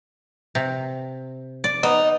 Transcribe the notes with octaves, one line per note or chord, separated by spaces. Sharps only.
C3
D5
B3 D#4